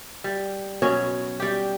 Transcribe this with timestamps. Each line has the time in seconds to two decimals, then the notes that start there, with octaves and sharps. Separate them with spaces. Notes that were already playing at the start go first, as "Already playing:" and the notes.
0.24 G3
0.82 B2 F#3 C#4 C#5
1.40 G3 G4